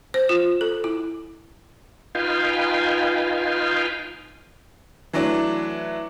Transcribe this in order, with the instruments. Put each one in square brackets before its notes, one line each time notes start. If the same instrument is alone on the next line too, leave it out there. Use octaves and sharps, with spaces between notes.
[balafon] C5
F4
A4
E4
[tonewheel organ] D#4 F4 B4 F5 G5 G#5
[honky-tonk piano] E3 F#3 A3 D4